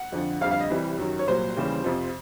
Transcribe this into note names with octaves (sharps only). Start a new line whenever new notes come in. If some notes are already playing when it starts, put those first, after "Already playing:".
Already playing: F#5
F2 D3 F3
F2 D3 G3 F5
F5
D#5
C2 C3 E3 G3
F#2 D#3 F#3
C#5
C2 A#2 F#3 C5
D#2 C#3 E3 G3
F2 C3 F3